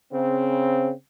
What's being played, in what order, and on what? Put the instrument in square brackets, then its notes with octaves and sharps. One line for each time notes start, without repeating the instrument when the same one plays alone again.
[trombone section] C#3 C4